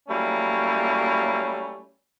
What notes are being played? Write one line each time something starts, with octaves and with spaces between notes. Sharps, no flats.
F#3 G3 A3 A#3 C#4 E4